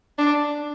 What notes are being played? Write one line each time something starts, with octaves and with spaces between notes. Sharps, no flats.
D4